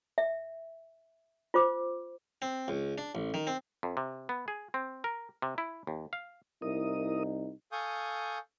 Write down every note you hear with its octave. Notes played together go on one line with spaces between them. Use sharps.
E5
F4 C5 D6
C4
C#2
D4
A1
D#3
C4
F2
C3
B3
G#4
C4
A#4
C3
E4
D#2
F5
C2 D#4 E4 A#4 D#6
A4 F5 G#5 C#6 D#6 G6